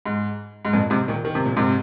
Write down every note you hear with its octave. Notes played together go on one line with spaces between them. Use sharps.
G#2
G#2
F2 A#2
G#2 C3
A#2 D#3
D#3
C3
A#2
G#2 C3